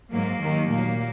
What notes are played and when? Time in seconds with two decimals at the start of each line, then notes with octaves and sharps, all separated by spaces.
0.12 G#2 F#3 A#3
0.42 D#2 D#3 F#3
0.72 A#2 F#3 A#3